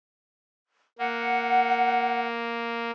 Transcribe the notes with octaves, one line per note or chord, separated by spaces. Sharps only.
A#3 F#5